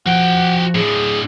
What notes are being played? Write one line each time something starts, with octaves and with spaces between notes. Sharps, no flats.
F3 F#4 F#5 G5
A2 D3 G#4